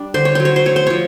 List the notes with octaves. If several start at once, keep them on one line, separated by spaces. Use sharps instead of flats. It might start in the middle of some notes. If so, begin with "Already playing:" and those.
Already playing: G3 D4
D3 C5
C#5
F#3 C5
C#5
C5
A3 C#5
C5
F3 C#5